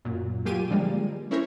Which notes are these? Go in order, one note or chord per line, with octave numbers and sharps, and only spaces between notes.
F#2 A#2
A#2 F#3 F4 G4 G#5 D#7
D3 F3 G3 G#3 A#3
C#4 E4 A#4 C5 C#5